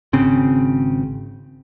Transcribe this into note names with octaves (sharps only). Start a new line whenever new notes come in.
G#1 C#3 C4